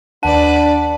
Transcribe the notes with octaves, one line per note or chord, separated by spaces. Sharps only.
D#2 D4 B4 D5 F#5 A5